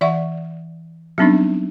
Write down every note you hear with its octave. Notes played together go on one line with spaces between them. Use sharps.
E3 D5 E5 F#5 C#6
F#3 G3 B3 C4 D4 D#4